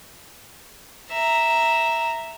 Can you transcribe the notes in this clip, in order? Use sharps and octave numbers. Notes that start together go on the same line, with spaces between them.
E5 A#5